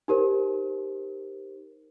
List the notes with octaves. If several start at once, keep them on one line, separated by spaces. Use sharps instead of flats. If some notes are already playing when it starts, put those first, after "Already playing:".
D#4 G4 A#4 C5